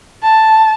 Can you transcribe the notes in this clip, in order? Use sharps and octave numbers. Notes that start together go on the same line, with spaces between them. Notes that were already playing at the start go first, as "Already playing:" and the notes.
A5